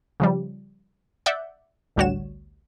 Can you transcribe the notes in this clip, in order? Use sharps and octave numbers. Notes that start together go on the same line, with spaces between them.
C#3 F3 G3
D5 E5 F#5 G6
A1 D2 G3 F#4 C#5 E7